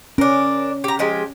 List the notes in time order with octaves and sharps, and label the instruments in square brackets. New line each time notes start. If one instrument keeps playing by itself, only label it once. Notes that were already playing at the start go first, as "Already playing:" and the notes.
[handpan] C#4 [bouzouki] D4 A#4
[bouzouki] G4 A#5
F3 G#3 G4